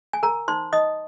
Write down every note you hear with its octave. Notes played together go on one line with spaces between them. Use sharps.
G#5
A#4 A#5
D#4 C5 C6
D#4 D#5 D#6